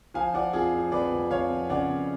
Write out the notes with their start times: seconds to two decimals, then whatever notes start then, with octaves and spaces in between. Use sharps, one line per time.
0.14 F3 F5 G#5
0.34 F3 D5 F#5
0.53 F2 F4 G#4
0.73 F3
0.92 F2 B4 D5
1.12 F2
1.31 F2 C#5 F5
1.50 F2
1.69 C#3 D5 F#5
1.90 F2